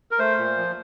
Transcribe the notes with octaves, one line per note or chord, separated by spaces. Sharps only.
A#4
A3 C5
A#2
F3